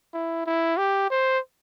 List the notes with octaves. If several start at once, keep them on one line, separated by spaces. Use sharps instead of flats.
E4
E4
G4
C5